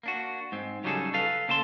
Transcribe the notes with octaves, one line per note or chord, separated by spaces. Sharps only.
A#3 D4 F#4
G#2 C4
C#3 F#3 G3 D#4 G#4 A4
A4 B4 F5
C#3 A#3 A4 A5 C6